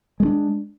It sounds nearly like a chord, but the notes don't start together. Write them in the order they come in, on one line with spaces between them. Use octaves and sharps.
G#3 A3 D4